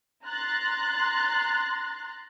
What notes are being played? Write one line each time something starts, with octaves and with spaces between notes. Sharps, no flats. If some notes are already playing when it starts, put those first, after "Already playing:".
A#5 C6 F#6 A6